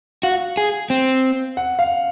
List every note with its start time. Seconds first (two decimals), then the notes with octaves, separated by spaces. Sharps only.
0.23 F#4 F5
0.57 G#4
0.90 C4
1.57 F#5
1.79 F5